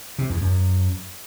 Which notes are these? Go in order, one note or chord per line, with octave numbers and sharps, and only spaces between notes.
C3
E2
F#2